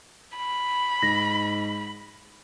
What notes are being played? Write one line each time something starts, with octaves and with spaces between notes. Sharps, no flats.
B5
G#2 A#6